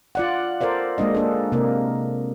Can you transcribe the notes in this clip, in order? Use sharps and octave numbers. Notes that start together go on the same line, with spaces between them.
F4 D5 F#5
A4 A#4 C5 D5 F5
G#3 A#3 D4 D#5
A#3 D4 A4
C3 A#3 A#4